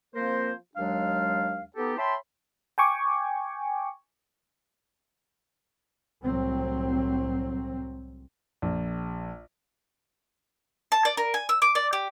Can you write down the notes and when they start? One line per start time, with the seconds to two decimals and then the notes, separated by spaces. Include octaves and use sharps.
0.14 F3 A#3 C4 A#4 C5
0.76 D#2 F#3 G#3 D4 F5
1.76 B3 D#4 G4 A4
1.98 C#5 E5 G5 A5 B5 C6
2.78 G5 G#5 C#6 D6
6.24 C2 A2 F#3 C4
8.62 A#1
10.92 A5
11.05 D5
11.17 A#4
11.34 G#5
11.49 E6
11.62 D6
11.75 D5
11.93 G4